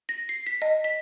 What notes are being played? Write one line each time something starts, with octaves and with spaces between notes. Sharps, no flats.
A#6
C7
B6
D#5
B6